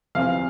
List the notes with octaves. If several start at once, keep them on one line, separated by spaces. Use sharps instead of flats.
E2 C3 F3 F5